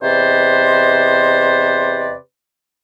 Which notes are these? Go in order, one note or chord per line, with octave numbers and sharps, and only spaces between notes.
E2 C3 B4 C5 D5 D#5